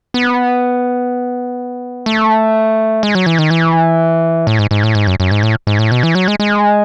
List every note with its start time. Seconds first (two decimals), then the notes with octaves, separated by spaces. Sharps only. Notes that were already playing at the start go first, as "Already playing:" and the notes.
0.14 B3
2.06 A3
3.03 G#3
3.15 F#3
3.26 E3
3.39 D#3
3.51 E3
4.47 A2
4.59 G#2
4.71 G#2
4.83 A2
4.95 G#2
5.07 F#2
5.20 F#2
5.31 G#2
5.43 A2
5.67 G#2
5.79 A2
5.92 B2
6.03 E3
6.15 F#3
6.28 G#3
6.40 G#3